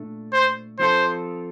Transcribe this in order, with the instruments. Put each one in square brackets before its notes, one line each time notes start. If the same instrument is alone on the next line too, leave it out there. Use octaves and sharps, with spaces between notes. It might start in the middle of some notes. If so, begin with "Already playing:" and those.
Already playing: [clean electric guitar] A#2 A3 D4
[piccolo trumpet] C5
[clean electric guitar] F3 C4 F4 A4 [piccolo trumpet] C5